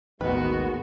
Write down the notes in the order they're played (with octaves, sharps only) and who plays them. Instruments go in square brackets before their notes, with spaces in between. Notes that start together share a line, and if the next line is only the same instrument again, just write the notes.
[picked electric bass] A1 D#2 [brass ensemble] D#3 G#3 [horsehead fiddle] B3 F#4 [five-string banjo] B4